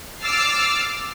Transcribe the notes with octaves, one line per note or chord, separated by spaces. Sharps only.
D6 E6 F6 A6 C7